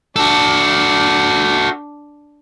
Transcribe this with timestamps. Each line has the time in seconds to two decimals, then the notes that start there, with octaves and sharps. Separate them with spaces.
0.16 D4 F#4 A4